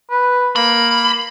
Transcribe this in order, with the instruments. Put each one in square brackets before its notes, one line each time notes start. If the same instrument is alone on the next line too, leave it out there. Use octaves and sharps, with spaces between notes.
[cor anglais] B4
[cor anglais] A#3 [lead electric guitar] B5